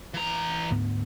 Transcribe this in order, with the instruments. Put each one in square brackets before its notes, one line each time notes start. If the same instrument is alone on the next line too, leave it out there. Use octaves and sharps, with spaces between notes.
[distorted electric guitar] E3 A#5
[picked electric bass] D2 G#2 B3